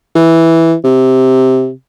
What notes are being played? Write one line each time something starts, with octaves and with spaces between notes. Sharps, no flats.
E3
C3